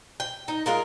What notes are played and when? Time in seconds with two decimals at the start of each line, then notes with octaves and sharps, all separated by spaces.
0.20 G5
0.48 D#4
0.66 G#3 F4 A#4